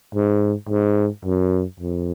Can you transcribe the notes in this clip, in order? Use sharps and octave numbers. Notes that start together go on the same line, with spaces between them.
G#2
G#2
F#2
F2